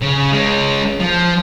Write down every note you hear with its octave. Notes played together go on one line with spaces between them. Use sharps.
C#3
G#3 C#4
F3